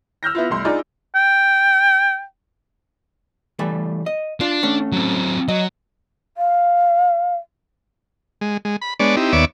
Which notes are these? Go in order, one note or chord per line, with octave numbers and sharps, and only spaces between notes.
E6 F6 G6 A#6
B3 E4 F4
F1 C2 C6
D4 D#4 F4 G#4 D5
G5
E3 G3 A3
D#5
D4 F4
A3 C#4
F#3 C4
F#3 D#5
F5
G#3
G#3
B5
G#3 B3 D4 C#5 D5
C4 D#4 E4 G4
D#2 B3 C#5 D5 E5 D6